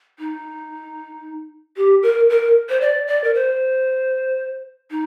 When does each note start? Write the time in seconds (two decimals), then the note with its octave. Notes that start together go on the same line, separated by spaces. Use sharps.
0.19 D#4
1.77 G4
2.03 A#4
2.30 A#4
2.69 C5
2.81 D5
3.07 D5
3.24 A#4
3.34 C5
4.91 D#4